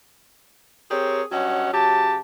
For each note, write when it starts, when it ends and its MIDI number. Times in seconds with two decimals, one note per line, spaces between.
0.91 1.22 60
0.91 1.22 67
0.91 1.22 68
0.91 1.22 70
0.91 1.22 73
1.31 1.70 43
1.31 1.70 54
1.31 1.70 61
1.31 1.70 75
1.31 1.70 78
1.73 2.18 49
1.73 2.18 54
1.73 2.18 67
1.73 2.18 81